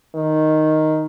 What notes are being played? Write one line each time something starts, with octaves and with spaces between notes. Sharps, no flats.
D#3